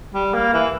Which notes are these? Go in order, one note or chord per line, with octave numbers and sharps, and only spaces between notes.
G3
A#3
E3